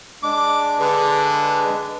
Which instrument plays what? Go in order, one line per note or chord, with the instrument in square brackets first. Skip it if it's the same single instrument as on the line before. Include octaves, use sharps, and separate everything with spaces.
[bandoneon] G#3 D4 [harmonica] D6
[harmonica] D3 [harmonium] G#4 B4